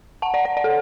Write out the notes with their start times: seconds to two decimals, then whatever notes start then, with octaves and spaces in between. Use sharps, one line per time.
0.22 F#5 A5
0.34 D5 F#5
0.45 D5 F#5
0.57 D5 F#5
0.64 A4